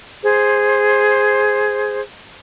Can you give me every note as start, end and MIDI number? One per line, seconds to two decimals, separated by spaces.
0.23 2.00 68
0.23 2.00 72